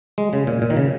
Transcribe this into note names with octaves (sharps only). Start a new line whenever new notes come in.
G#3
C#3
A#2
A#2
D#3
C#3